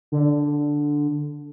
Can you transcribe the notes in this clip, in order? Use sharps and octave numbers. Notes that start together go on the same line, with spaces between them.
D3